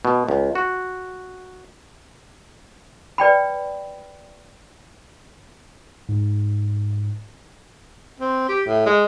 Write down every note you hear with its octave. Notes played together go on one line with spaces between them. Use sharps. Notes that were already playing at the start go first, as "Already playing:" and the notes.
B2
C#2
F#4
B4 D5 G5 B5
G#2
C4
G4
A2
G#3